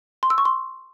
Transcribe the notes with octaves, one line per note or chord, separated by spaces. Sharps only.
C6
E6
C#6
C6